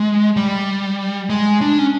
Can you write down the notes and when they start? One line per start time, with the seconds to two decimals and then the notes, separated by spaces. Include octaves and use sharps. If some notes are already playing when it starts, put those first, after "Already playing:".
Already playing: G#3
0.36 G3
1.30 G#3
1.61 D4
1.79 C#4